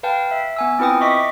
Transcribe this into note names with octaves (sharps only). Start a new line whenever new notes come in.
B4 F5 G5 A5
E5
B3 G#5 E6
C4 E4 F4 B4 G5 D#6
D#5 E5 C#6 D6 B6